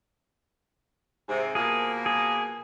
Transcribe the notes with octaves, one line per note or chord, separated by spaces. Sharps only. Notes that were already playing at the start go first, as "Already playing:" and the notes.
G#2 C3
B2 F3 A#3 G#4
G#4